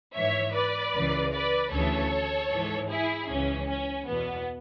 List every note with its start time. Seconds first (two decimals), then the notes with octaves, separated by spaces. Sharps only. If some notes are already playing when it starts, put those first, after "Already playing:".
0.15 G#2 E3 C#5 E5
0.54 B4 D5
0.94 C#2 C#3 E3
1.32 B4 D5
1.72 D2 C#3 E3 A4 C#5
2.51 G#2 E3
2.89 E4 G#4
3.29 C#2 C#3 E3 C#4
3.68 C#4
4.07 E2 B2 B3